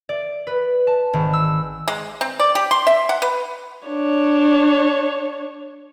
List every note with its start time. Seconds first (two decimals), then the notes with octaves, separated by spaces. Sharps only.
0.09 D5
0.47 B4
0.87 A5
1.13 G#1
1.33 E6
1.88 G#3
2.21 C4
2.40 D5
2.55 G4
2.71 C6
2.87 E5
3.09 F#5
3.22 B4
3.88 D4 C#5